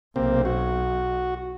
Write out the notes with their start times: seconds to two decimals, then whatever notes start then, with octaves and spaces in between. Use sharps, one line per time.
0.16 B1 C3 A#3 C4
0.45 F#4